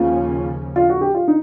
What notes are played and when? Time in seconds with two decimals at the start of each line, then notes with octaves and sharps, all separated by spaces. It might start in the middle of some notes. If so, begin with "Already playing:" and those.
Already playing: D#2 C#3 F3 A#3 C#4 F4
0.76 F4
0.89 F#4
1.01 G4
1.15 F4
1.28 D#4